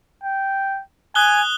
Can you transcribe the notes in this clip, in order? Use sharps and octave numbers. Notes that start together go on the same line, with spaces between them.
G5
G#5 D#6 F#6 G7